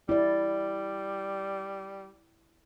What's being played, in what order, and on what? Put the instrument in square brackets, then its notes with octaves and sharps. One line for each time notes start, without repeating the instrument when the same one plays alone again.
[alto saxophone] G3 [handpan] E4 D5